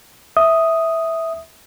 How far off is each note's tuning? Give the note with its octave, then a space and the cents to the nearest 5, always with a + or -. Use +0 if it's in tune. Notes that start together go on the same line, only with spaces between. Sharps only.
E5 -10 D#6 +0